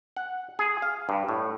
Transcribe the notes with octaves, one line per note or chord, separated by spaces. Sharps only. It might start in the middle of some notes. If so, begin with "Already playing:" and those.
F#5
G#4
F5
G2
A2